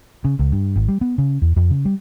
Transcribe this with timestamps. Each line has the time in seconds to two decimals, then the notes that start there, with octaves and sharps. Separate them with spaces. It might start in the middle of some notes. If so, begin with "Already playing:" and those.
0.25 C#3
0.39 C#2
0.52 G2
0.76 G#1
0.88 G3
1.01 B3
1.18 C#3
1.42 E2
1.56 F2
1.70 C#3
1.85 G3